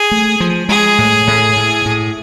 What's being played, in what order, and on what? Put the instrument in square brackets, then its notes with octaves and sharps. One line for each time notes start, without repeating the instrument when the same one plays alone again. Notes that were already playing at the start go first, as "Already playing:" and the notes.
Already playing: [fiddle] G#4
[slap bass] A3
F3
[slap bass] G#3 [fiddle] G#4
[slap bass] A2
A2
A2
A2